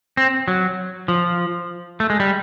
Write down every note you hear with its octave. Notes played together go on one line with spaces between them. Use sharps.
C4
F#3
F3
A3
G#3
G3